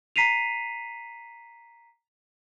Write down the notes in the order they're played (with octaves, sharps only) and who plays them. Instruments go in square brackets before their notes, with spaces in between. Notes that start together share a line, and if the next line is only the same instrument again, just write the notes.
[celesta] A#5 B6 C7 D#7 F7